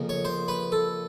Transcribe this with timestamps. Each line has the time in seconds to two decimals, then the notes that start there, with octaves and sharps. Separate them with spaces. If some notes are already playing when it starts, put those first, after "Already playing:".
Already playing: F2 C#3 F3 A#3
0.09 C#5
0.25 C5
0.48 B4
0.72 A4